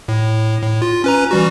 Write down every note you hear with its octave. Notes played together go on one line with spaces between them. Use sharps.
A2
A2
F4
C#4 B4 A#5
E3 G3 F#4